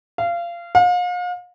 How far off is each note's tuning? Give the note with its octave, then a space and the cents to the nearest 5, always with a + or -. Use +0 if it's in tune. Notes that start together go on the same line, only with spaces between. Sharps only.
F5 -25
F5 +40